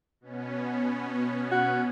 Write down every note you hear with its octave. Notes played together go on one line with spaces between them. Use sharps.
B2 B3 C#4
F#4